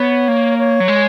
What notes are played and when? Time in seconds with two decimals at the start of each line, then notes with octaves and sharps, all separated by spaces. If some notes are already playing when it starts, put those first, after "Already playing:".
Already playing: B3 C#5
0.28 A#3
0.58 C#5
0.80 F#3
0.88 G#3